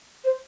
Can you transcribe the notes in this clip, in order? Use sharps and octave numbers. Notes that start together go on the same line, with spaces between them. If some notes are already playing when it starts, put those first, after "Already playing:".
C5